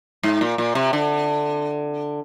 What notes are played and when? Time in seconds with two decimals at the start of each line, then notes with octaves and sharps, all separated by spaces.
0.23 G#2
0.41 A#2
0.58 A#2
0.75 C3
0.93 D3